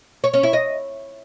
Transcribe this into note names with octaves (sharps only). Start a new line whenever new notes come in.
C#5
C#4
E4
D#5